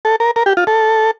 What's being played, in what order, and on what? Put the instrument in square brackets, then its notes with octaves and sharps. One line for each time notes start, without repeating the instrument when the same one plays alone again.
[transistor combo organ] A4
A#4
A#4
G4
F4
A4